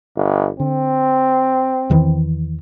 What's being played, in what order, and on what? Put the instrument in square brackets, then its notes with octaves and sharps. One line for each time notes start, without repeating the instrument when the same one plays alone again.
[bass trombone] G1
[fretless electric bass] D3 [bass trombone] C4
[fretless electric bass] E2 D#3 E3